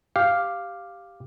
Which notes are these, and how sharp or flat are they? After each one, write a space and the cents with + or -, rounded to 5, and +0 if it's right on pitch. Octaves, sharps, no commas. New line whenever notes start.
G4 +0 F5 +0